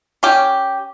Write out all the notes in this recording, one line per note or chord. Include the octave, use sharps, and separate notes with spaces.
C#4 G4